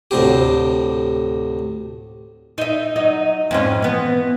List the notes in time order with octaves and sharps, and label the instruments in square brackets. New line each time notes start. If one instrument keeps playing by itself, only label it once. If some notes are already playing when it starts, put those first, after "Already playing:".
[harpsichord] D2 A2 C3 G4
[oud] D#4 E5
F#3 D#4 D#5
F2 G#2 C#4
E3 B3